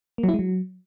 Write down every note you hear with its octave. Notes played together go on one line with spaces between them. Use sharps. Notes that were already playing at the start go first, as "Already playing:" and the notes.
A#3
F#3
E4
G#3
F#3